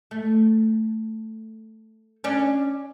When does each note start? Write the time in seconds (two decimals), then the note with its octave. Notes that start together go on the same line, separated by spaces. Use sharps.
0.11 A3
2.24 C#4 D4